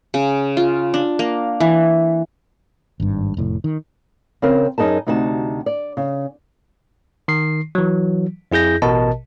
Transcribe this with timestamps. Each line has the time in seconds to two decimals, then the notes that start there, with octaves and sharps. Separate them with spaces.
0.14 C#3
0.57 F4
0.94 D4
1.19 A#3
1.60 E3
3.00 G#1 G2
3.37 F1 A2
3.64 D#3
4.42 C#3 C4 A#4
4.78 F#2 D#4 G#4 A#4 A5
5.07 D2 C3 D#4 F#4 G#5 A5
5.66 D5
5.97 C#3
7.28 D#3 C7
7.75 E3 F#3
8.52 F2 E4 G#4 G6 A#6
8.82 A1 B2 A#4 D#5 A5